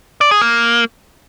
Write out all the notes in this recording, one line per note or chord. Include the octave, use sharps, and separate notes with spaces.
D5
G#4
A#3